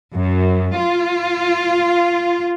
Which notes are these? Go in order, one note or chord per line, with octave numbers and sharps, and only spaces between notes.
F#2
F4